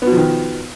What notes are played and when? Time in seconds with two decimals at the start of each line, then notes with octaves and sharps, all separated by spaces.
0.02 B3
0.07 B2
0.12 F3
0.17 D#3